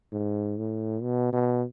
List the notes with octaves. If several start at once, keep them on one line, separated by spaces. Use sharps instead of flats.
G#2
A2
B2
B2